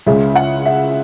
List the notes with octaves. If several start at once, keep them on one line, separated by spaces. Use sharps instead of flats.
C#2 C#3 G#3 E5
F#5
E5